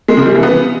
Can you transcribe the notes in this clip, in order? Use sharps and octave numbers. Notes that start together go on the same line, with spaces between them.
G#3
C#3
G3
E3
B3